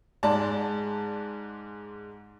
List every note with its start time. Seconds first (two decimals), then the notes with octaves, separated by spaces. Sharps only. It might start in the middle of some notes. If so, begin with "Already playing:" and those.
0.23 G#2 G#3 D5 A5